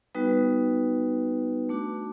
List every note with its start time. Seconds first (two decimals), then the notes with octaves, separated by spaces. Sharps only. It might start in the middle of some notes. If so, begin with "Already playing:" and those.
0.15 G3 B3 D#4 F#4 B4
1.69 A3 D4 F#4